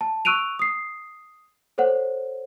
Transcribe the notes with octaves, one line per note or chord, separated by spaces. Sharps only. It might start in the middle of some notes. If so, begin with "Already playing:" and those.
A5
C#6 E6 F#6 D7 D#7 F7
D#6 C7
A4 C5 C#5 F#5